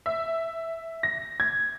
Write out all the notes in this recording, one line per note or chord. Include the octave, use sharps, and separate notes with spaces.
E5
A#6
G#6